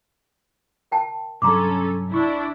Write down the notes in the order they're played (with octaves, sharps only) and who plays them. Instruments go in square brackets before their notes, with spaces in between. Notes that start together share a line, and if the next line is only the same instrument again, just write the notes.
[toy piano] A#4 G5 A5
[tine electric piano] G2 C3 F#3 [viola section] C#4 A4 [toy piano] A#5 C6 D6
[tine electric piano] A#1 C#6 [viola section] D4 E4